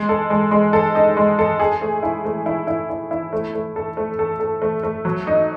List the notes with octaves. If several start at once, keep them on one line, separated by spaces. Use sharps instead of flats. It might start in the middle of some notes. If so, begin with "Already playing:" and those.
Already playing: G#3
A4
G#3
G#3
A4
D#4
G#3
A4
G#4
A3
E4
A3
E4
E4
E4
E4
A3
A3
A4
A3
A4
A4
A3
A3
F#3
D#4